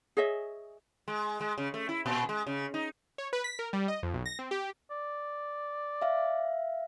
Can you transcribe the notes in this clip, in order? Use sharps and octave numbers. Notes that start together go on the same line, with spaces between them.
G#4 C#5 D#5 E5
G#3
G#3
C#3
A3
E4
A#2
G#3
C#3
D#4
C#5
B4
B6
A#4
G3
D#5
F2
B1
A#6
C4
G4
D5
E5 F5